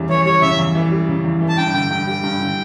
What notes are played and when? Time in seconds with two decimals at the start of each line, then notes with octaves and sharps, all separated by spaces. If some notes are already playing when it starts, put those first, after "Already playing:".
Already playing: E2 C#3 G3
0.09 E3 C#5
0.25 G3 C#5
0.42 C#3 E5
0.58 E2
0.75 E3
0.92 G3
1.08 C#3
1.25 E2
1.41 E3
1.49 A5
1.57 G2 G5
1.74 D3 G5
1.90 G2 G5
2.07 G3 G5
2.23 G2
2.40 D3